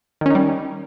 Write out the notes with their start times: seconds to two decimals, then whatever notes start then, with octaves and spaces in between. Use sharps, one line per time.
0.21 D#3
0.26 C#4
0.30 D#4
0.35 G3